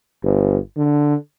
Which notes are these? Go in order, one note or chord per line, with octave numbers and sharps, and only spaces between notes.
G1
D3